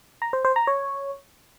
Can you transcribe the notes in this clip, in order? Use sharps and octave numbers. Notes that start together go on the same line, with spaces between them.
A#5
C5
C5
A#5
C#5